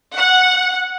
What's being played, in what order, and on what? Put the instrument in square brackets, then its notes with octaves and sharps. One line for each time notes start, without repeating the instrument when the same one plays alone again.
[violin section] F#5